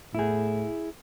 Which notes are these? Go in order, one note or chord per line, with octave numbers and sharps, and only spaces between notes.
A2 E4 G#4